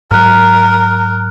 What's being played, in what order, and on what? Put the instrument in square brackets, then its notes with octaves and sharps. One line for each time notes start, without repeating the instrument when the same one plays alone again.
[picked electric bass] G#2 F#3 [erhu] A#4 [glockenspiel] F6 F#6